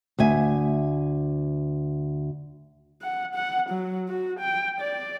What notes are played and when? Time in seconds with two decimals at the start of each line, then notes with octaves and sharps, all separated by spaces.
0.19 D2 E5 G#5
3.02 F#5
3.35 F#5
3.70 F#3
4.09 F#4
4.40 G5
4.81 D5